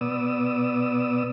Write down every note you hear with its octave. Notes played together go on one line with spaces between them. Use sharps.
B2 B3 D5 D#6 E6